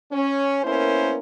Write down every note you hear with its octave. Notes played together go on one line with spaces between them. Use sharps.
C#4
A#3 B3 C#4 E4 A#4 C5